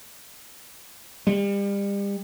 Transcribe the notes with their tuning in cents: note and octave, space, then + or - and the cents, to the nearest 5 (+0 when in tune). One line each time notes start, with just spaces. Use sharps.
G3 +35